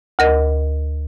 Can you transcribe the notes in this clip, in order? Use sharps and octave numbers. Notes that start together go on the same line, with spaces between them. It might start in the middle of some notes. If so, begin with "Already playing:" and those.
D2 A#4 D#5